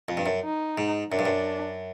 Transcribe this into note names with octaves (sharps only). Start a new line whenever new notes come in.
F2
G2
F#2
D#4
G#2
F#2 D4
G2
F#2